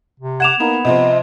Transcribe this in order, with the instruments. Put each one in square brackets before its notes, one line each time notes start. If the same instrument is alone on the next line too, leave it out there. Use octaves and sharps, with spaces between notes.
[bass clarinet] C3
[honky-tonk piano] F#5 D6 [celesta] G#6 E7 F7
[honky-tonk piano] A#3 D#4 A#4 [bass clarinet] B3
[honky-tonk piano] C3 F3 C4 [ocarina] D#5